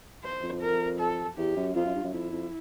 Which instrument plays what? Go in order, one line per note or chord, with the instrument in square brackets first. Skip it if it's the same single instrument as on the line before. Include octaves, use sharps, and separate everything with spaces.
[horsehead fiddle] C5
[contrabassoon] F2
F2
[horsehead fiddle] A#4
A4
[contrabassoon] E2 [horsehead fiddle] G4
[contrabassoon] F#2
[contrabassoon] F2 [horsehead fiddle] F4
[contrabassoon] F#2
G2
F#2
[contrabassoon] F2 [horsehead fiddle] E4
[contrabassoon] F2